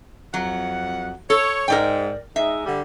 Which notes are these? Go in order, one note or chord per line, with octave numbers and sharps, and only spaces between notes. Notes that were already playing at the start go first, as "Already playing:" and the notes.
F2 F#3 F#5
A4 C#5
G#2 A#4 D5 G5
G#3 D#4 E5
D3 G3